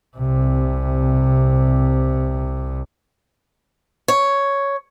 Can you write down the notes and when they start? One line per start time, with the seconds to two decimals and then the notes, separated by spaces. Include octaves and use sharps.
0.17 C2 C3
4.08 C#5